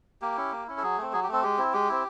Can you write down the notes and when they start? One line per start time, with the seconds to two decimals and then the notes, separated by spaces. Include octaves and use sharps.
0.22 A#3 G4
0.37 C#4 E4
0.52 A#3
0.67 C#4 E4
0.78 A4
0.83 F#3 G#4
0.98 A3 C4
1.13 F#3 G#4
1.23 G4
1.29 A3 C4 A4
1.43 G#3 G4
1.58 C4 E4
1.73 G#3 G4
1.89 C4 E4